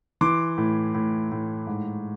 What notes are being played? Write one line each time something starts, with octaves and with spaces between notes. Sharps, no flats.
E3 C6 D6
A2
A2
A2
G#2